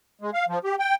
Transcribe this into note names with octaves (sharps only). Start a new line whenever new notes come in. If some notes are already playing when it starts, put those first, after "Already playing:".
G#3
F5
F3
G4
G5